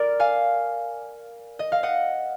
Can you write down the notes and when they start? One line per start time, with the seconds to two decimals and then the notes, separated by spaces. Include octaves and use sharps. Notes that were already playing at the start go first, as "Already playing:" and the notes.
Already playing: A#4 D5
0.20 F5 G#5
1.59 D#5
1.72 F5
1.83 D#5 F#5